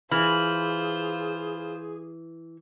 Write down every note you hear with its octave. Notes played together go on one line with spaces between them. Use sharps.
E3 F4 G#4 C5 B5 F6